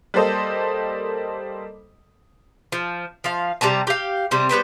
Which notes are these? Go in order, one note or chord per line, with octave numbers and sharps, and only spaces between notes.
G3 A#3 A4 C5 D#5
F3
F3 F5
C3 G3 A5 A#5
G4 F5
C3 G3 C4
G3 B3 B4 C5